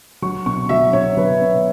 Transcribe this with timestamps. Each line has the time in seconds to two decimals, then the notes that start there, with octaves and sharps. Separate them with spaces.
0.22 F#3 C#6
0.46 B2 C#6
0.69 F#3 E5
0.93 B2 C#5
1.17 F#3 B4
1.41 B2